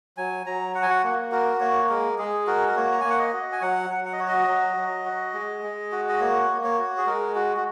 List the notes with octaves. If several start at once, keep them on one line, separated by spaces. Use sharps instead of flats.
F#3 G#5
F#3 A#5
F#4 F#5
G#5
F#5
A#3
F#4 A#4
A#3 C#5
G#3 A#4
G#3 G#4
F#4 A#4
A#4
A#3 C#5
A#5
A#3 G#5
F#5
D#5
F#4
G#5
F#3 F#5
F#3
F#5
D#5
F#4 C#5
D#5
F#3
F#3
F#4
G#3
G#3
F#4
D#5
A#3 C#5
A#3
C#5
F#4
G#4
G#3 A#4
F#4
F#4